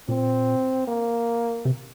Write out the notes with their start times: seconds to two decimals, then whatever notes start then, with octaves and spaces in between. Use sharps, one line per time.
0.09 A#2 C4
0.87 A#3
1.65 C3